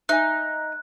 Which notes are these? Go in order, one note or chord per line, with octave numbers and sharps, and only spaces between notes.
D#4 E5 G#5 F#6